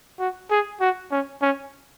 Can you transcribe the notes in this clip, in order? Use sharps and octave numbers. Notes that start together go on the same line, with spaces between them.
F#4
G#4
F#4
C#4
C#4